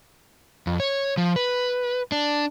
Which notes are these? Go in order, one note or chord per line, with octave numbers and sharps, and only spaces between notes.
F2
C#5
F3
B4
D4